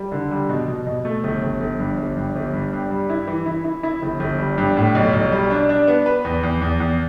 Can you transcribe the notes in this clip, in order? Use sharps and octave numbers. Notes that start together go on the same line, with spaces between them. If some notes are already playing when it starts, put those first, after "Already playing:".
Already playing: G3
D3
G3
B2
B2
B2
A3
G1
G1
G1
G2
G1
G2
G1
G2
G2
G3
E4
E3
E4
E4
E4
G1
G1
G3
G2
A2
B1
B1
G3
D4
D4
B3
B4
E2
E2
E2
E2